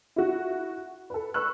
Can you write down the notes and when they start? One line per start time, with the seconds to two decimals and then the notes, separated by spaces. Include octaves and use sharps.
0.16 E4 F#4
1.10 A4 B4
1.34 B4 C#6 E6 F#6